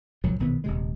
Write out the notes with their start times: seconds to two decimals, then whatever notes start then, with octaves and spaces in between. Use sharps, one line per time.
0.24 C2 A#2 F3 F#3
0.40 A#1 B2 D#3 B3
0.64 D#1 C3 G#3